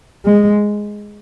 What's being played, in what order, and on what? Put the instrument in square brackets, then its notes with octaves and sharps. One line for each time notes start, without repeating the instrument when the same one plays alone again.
[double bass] G#3